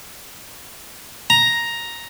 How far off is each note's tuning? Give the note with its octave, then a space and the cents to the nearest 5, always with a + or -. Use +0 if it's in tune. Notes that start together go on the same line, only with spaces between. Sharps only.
A#5 +5